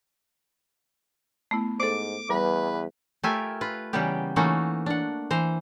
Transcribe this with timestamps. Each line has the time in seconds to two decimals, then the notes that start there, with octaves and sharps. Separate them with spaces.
1.51 A3 B3 E4
1.80 G#2 A4 C5 D6
2.30 E2 G3 B4
3.23 A3 F4 G4 A#4 E5 G#5
3.61 F4 B4
3.93 C#3 E3 G3 A#3 B3 G4
4.36 E3 A3 A#3 C#4 D#4 F#4
4.86 D4 F#5
5.31 E3 C5 A#5